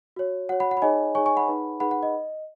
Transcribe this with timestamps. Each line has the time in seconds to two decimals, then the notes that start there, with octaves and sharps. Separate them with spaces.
0.16 F#4 C#5
0.49 F#4 C#5 F#5
0.60 F#5 B5
0.71 F#5
0.77 B5
0.82 D#4 G#4 C#5 D#5 G#5
1.15 D#4 G#4 C#5 G#5 C#6
1.26 G#5 C#6
1.37 F#5 B5
1.48 D#4 G#4 B4
1.80 D#4 G#4 B4 F#5 B5
1.91 F#5
2.03 D#5